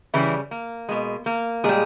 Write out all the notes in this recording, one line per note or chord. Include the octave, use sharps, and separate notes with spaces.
C#3 E3 G3 E4
A#3
B2 G#3
A#3
A#2 G3 G#3 G#4